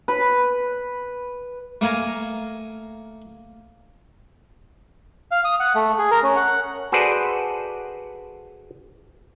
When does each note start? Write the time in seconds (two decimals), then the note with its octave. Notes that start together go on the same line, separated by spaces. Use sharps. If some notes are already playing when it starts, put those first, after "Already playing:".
0.08 B4 B5
1.81 A3 A#3 F5 G#5 A#5
5.31 F5
5.45 D#6
5.60 F#5
5.75 A3
5.99 G#4
6.11 A#4
6.23 C#4
6.36 F#5
6.92 F#4 G#4 A4 B4 C5 D5